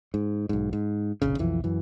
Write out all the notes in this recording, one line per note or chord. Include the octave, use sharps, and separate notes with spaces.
G#2
B1 G#2
G#2
F1 A#1 C#3
B1 F2 E3
F#2 E3